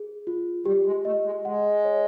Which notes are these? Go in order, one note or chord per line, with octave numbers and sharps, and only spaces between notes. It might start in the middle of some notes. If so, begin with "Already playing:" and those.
Already playing: G#4
F4
G3 G4
G#3
A3 D#5
G#3
G#3 F#5
C#5